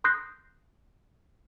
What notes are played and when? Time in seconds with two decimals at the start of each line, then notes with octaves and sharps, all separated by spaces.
0.04 C6 D#6 F#6 G6 A#6 C7